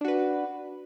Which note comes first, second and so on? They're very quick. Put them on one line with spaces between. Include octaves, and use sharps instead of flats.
D4 F#4 B4